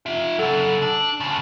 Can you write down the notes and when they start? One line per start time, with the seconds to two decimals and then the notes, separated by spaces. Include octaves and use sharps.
0.06 F4 E5
0.39 C#3 F#3 A4
0.82 D4
1.20 D2 C#3 A5